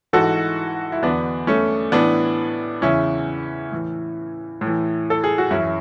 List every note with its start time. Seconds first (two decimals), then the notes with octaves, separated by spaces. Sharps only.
0.13 G#2 E3 F#4 A4
0.92 E4
1.02 E2 D3 B3 D4
1.47 A3 C#4
1.92 A2 E3 B3 D4
2.82 E2 C#3 E3 C#4 E4
3.72 A2 E3
4.61 A2
4.67 E3
5.10 A4
5.24 G#4
5.38 F#4
5.51 F#2 C#4 E4
5.56 E3